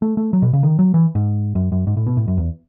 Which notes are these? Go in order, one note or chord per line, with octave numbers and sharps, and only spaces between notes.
A3
A3
F#3
B2
C#3
D#3
F#3
E3
G#2
F#2
F#2
G#2
A2
B2
A2
F#2
E2